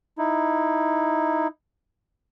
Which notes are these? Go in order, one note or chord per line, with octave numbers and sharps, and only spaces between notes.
D#4 E4